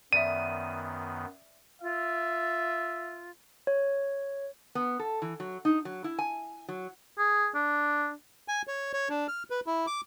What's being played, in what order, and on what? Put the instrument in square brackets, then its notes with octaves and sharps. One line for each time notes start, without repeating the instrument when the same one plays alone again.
[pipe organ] F#2 D#3 B3 [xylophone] D5 E5 [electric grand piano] D#7
[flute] F4 [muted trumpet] E5
[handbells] C#5
[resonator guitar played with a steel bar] B3
A4
E3
F#3
D#4
F#3
E4
G#5
F#3
[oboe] G#4
D4
[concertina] G#5
C#5
C#5
D4
F6
B4
E4
D6